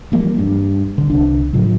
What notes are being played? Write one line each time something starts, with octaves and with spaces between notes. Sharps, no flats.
E3 F3 G3 A#3
G2
D3
C2 D4
A2 C#3 F3 F#3